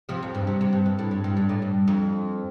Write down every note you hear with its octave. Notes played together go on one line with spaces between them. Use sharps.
C3 F3
F2
G2
C3
C3
G2
G2
A2
G2
G2
G2
A2
G2
F2